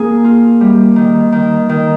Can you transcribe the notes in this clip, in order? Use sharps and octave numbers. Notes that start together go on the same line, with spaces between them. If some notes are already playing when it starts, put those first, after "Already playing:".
Already playing: A#3 G#4
F4
G3
D#3
D#3
D#3